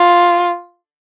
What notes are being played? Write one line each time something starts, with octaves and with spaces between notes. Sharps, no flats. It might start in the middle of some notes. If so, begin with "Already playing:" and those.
Already playing: F4